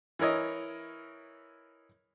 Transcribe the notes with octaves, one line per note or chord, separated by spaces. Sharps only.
E3 E4 A#4 C#5 D#5